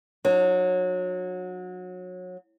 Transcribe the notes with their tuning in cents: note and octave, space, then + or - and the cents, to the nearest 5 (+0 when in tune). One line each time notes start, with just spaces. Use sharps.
F#3 -25 D4 +40